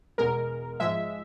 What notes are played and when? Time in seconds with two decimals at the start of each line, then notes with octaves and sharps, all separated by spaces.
0.18 E2 B2 G#3 A#4
0.80 G#2 F3 G#3 E5